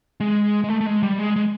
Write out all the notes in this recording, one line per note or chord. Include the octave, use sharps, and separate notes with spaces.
G#3
G#3
A3
A3
G#3
G3
G#3
G#3